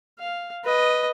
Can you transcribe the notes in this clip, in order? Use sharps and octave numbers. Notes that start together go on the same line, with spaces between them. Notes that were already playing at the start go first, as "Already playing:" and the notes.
F5
B4 D#5